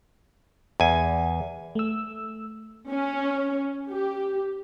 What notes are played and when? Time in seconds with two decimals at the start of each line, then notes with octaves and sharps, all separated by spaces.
0.80 E2 G#5
1.75 A3 E6
2.89 C#4
3.90 G4